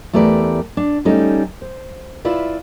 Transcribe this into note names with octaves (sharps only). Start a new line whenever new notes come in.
E2 A3 G4 A#4 B4 D5
D4
G3 A3 C#4 D#4 A4
C5
E4 F4 B4 D5 E5